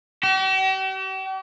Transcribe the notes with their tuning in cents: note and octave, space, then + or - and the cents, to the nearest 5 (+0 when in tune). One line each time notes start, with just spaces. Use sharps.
G4 -45